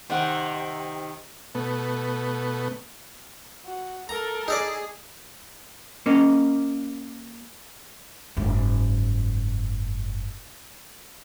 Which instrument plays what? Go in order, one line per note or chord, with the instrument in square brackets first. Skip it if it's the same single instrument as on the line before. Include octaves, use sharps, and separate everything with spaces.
[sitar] C3 D#3 [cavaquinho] C5 F#5
[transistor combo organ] B2 A3 B3
[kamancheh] F#4
[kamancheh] A4 A#4 [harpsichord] A#5
[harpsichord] D#4 A4 D5 [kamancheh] G#4
[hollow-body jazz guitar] A#3 C#4 A#4 D#5
[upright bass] F#1 G#2